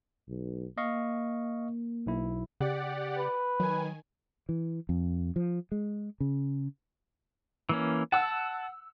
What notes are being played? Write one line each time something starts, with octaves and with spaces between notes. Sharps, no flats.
B1
A#3 D#5 F5 C#6
B1 E4
C#3 G4 D5 F#5
B4
D#3 F#3 G#5
E3
F2
F3
G#3
C#3
E3 A#3 C#4
F#5 A5 E6